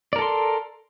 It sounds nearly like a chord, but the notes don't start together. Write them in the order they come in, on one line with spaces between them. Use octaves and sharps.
D5 A#4 A4 C6